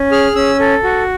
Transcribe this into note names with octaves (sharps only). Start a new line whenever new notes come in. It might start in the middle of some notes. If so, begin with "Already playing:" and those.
Already playing: C#4
G#4 F6
C#4 E6
A4
F#4